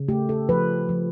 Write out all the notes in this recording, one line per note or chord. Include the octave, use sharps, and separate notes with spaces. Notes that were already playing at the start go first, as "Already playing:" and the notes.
Already playing: C#3
A3 G4
A4
F3 B4
F3